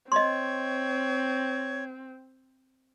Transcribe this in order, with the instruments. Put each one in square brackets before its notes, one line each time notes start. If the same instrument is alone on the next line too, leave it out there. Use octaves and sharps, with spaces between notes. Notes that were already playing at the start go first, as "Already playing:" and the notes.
[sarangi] C4 [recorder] C#5 [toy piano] D#5 C6